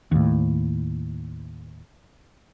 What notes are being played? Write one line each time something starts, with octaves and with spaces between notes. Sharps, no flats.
D#2 A2